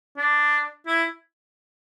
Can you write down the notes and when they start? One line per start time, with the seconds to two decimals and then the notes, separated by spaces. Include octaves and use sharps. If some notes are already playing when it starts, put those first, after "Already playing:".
0.17 D4
0.87 E4